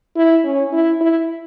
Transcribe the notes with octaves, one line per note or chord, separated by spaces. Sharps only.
E4
C#4
E4
E4